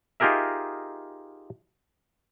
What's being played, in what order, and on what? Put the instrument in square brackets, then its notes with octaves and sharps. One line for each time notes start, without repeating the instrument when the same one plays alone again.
[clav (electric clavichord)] D#4 F4 G4 G#4 A#4 E5